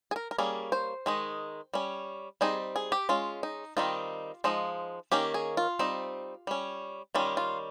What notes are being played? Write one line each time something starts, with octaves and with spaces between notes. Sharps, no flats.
G#4
A#4
A#4
G3 A#3 C#4 G#4
C5
D#3 G#3 D#4
G3 C#4
G3 C4 D#4 G#4
G#4
G4
G#3 C#4 F4
D#4
D#3 G3 C4 D#4 F4
F3 G#3 D#4
D#3 A#3 C#4 G4
G#4
F4
G3 C4 D#4
G3 C#4
D#3 G3 C#4 F4
F4